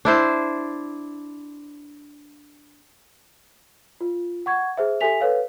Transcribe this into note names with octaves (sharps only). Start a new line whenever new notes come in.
D4 E4 C5
F4
F#5 C#6 G#6
G#4 C5 E5
G4 A4 E5 G#5 B6 F7
A4 B4 C#5 F5